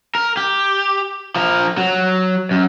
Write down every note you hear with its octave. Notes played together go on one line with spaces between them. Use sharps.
A#4
G4
F3 A#4
F#3
F#2